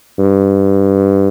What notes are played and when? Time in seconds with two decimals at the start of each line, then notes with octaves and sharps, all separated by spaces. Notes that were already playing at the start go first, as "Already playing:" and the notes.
0.19 G2